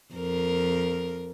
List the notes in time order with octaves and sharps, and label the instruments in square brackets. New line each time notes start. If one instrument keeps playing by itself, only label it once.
[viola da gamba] F2 A#4